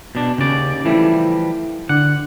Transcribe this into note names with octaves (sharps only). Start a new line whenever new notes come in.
B2 D4
D#2 C#3 D5
E3 F3 G3 A3 E4
D3 F#5